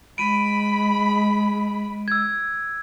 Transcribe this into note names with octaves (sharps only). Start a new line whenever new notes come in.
G#3 B5 D7 D#7
E6 G#6